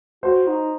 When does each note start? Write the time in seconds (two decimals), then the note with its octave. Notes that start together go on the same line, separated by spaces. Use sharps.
0.23 F#4 C5
0.46 D#4